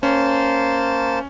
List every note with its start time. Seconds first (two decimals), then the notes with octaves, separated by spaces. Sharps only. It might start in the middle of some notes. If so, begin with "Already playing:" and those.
0.03 A#3 C#4 C5 A5